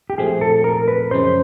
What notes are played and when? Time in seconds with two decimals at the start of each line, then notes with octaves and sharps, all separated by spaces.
0.10 G4
0.18 A#2 F3 A3 C4 G#4
0.41 A4
0.64 A#4
0.88 B4
1.11 F#2 C#3 F3 G#3 C#4 C5